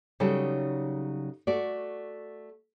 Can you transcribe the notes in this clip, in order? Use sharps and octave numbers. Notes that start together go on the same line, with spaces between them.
C#3 F#3 G3 D#4 A4 C#5
A3 F#4 D5